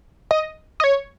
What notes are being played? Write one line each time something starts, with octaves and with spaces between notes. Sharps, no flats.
D#5
D#5
C#5